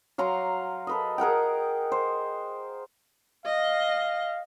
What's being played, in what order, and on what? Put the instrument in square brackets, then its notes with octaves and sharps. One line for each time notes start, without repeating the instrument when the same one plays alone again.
[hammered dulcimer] F#3 F5 A#5 C6
A4 B4 D#5
G#4 A#4 F#5 G5
C5
[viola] D#5 [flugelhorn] F5